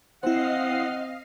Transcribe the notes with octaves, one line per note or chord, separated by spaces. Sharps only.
C4 E4 C5 D#5 F5 F#5 C7